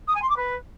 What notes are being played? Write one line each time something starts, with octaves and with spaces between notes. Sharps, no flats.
D#6
G#5
C6
D6
B4